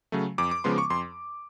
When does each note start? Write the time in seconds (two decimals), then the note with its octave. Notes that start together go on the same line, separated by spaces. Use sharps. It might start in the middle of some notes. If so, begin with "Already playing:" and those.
0.12 C#3 F#3 A3
0.38 F2 D6
0.51 D6
0.64 C#3 F3 G#3 B3 C6
0.78 C#6
0.90 F2 C6